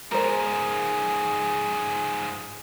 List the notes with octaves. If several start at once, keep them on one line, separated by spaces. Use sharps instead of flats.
G#2 F3 G#4 A#4 C5